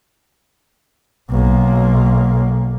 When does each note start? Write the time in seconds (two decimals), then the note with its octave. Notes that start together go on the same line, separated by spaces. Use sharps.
1.30 B1 A#3